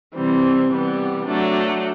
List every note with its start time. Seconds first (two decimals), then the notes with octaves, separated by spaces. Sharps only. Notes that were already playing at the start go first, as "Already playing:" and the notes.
0.14 C3 E3 G3 C4
0.70 C3 E3 G3 B3
1.26 F#3 A3 D4